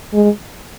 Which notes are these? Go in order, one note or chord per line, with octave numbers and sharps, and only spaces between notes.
G#3